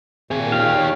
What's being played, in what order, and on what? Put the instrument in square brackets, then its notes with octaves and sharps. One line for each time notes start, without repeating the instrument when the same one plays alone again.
[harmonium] A#2 [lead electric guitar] C4 G#4
[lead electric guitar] D#3 G4 [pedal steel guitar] F5
[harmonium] B2 C#5